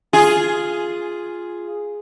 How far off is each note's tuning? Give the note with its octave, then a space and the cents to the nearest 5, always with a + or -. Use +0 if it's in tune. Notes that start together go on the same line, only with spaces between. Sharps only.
F4 +0 G#4 +0